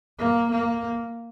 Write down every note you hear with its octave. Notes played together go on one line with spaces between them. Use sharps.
A#3
A#3